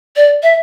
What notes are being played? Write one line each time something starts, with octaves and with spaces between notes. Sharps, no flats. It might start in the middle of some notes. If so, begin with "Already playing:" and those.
D5
E5